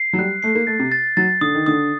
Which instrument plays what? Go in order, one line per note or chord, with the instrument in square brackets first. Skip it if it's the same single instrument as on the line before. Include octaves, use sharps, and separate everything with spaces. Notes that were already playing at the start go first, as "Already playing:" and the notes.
Already playing: [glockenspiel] C7
[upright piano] F#3
[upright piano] G3 [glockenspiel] F#6
[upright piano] A3 [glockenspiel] C7
[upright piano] A#3
[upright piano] A3 [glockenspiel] A6
[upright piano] C3
[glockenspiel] A6
[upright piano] F#3 [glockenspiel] A6
[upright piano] D3 [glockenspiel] D#6
[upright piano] D#3
[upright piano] D3 [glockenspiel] D#6